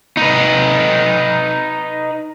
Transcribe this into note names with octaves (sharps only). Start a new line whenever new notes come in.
D#4 B4